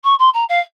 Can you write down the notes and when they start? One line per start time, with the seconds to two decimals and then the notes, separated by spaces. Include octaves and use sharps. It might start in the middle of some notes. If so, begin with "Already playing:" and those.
0.04 C#6
0.19 C6
0.33 A#5
0.49 F5